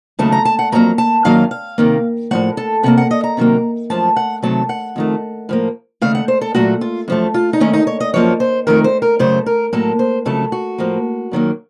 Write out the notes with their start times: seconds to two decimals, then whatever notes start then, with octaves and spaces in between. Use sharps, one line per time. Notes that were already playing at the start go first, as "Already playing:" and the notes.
0.19 D#2 C#3 F#3 A3 A5
0.32 A#5
0.45 A5
0.59 F#5
0.72 F2 C3 F#3 A#3 A#5
0.98 A5
1.25 F#2 D#3 F#3 A#3 F5
1.51 F5
1.78 C3 D#3 A#3
2.31 A2 F3 A3 F#5
2.57 A4
2.83 C3 F#3 A#3 F#5
2.98 F#5
3.11 D#5
3.24 A#5
3.37 C3 D#3 F#3 A#3
3.90 F#2 F3 A3 A5
4.16 F#5
4.43 C3 D#3 F#3 A3 A5
4.69 F#5
4.96 F2 D#3 A3
5.49 A2 F3 A#3
6.01 D#2 C#3 A3 F5
6.15 F#5
6.28 C5
6.41 A4
6.55 A#2 F#3 A3 F#4
6.81 F4
7.08 F#2 F3 A3
7.34 F4
7.53 D#4
7.60 D#2 D#3 A3 C#4
7.73 D#4
7.87 C#5
8.00 D#5
8.14 F#2 F3 A#3 C#5
8.40 C5
8.67 F2 D#3 A3 A#4
8.84 C5
9.02 A#4
9.19 F#2 C#3 A3 C5
9.46 A#4
9.73 A2 F#3 A#3 A4
9.99 C5
10.25 F2 C#3 F#3 A3 A4
10.52 F#4
10.78 A2 F3 A#3
11.31 F#2 D#3 F#3 A#3